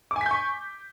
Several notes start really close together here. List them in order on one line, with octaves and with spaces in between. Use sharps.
D6 G#5 B6 G6 C#6